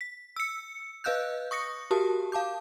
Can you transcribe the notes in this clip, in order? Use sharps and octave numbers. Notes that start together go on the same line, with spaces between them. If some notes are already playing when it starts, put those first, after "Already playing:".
B6
E6 C#7
B4 D#5 F5 E6 F#6 G6
C#6 D#6 A#6 C#7
F#4 G4 A#4 A5 D#6
F5 A5 D6 G6